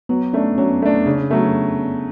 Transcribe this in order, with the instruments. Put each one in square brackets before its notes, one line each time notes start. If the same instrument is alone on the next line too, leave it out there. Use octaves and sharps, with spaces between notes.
[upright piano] F#3 [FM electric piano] B3
[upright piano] A3 D4 [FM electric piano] C#4
[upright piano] F#3 [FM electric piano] C#4
[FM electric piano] B3
[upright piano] A3 D4 [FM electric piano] B3
[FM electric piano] B3
[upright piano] C#3 [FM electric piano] D4
[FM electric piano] C#4
[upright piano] F#3 A3 [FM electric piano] B3